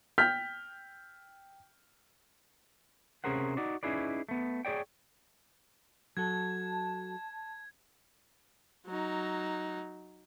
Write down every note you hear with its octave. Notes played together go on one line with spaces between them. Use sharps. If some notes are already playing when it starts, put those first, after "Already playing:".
G5 F6 G6 B6
C3 C#4 G#4 A#4 C5 F#5
D#4 F#4 D5
C#4 D#4 E4 G#4 B4 D5
A3 B3
G#4 C#5 D5 G5
F#3 F#4 A4 A5 G#6
F#3 D#4